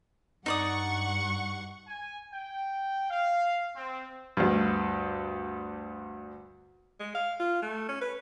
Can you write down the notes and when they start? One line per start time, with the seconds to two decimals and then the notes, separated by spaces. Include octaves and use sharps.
0.46 G2 D#4 D5 F#5 C#6 D#6
1.86 G#5
2.31 G5
3.10 F5
3.74 C4
4.37 D2 G2
7.00 G#3
7.15 F5
7.40 F4
7.62 A3
7.89 C#4
8.01 B4